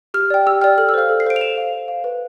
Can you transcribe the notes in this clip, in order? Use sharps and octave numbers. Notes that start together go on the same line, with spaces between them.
G4 F6
D5 G5
G4 E6
D5 G5 F6
A4 F6
E6
C5 F5 F6
A4
C7
C5 F5 D7
F7
C5 E7
F5
C5
F5
B4